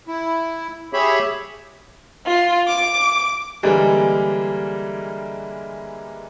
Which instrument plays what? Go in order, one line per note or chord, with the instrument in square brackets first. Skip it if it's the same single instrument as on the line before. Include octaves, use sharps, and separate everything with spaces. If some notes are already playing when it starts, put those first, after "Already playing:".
[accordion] E4
G4 G#4 C#5 E5 B5
[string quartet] F4
D6
[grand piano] D3 E3 G3 G#3 A#3